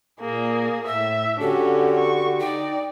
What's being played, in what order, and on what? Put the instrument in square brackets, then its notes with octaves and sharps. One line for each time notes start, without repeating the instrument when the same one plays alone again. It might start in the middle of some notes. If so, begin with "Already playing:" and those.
[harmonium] A#2 [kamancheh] A#3 G#4
[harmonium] A2 [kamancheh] E5 [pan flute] E6
[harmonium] D3 F#4 G4 [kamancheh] C#4 D4 [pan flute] A4
[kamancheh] C#6
[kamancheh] D#4 D5 [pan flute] G5